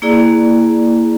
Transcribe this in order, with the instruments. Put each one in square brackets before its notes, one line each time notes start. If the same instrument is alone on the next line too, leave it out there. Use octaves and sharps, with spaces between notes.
[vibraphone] A#3 E4 G#4 D5